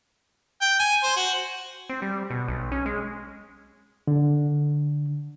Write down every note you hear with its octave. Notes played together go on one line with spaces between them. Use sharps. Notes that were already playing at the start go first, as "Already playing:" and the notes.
G5
G#5
C5
F#4
C4
G3
B2
B1
C#4
G#3
D3